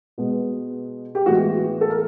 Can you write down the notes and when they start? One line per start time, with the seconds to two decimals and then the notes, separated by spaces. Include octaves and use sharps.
0.18 B2 G#3 B3
1.15 G4
1.26 A2 E3 G#3 B3 F#4
1.81 A4
1.90 A#4